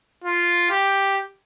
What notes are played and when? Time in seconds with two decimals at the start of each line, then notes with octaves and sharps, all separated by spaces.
0.24 F4
0.71 G4